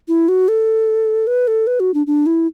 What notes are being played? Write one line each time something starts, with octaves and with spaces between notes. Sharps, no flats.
E4
F#4
A4
B4
A4
B4
F#4
D4
D4
E4